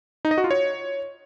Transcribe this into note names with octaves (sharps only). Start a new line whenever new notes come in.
D#4
D#5
F#4
F4
C#5